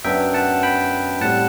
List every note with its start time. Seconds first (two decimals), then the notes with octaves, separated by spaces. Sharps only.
0.04 F#2 F#3 B3 D4 E5 G5
0.34 F#5 A5
0.63 G5 B5
1.21 A2 G3 C4 F#5 A5